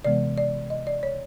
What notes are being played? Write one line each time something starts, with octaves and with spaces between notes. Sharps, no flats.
C3 E3 G#3 B3 D5
D5
D#5
D5
C#5